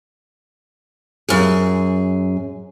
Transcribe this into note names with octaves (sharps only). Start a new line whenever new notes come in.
F#2 G#4